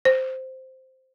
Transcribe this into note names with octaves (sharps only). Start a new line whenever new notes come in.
C5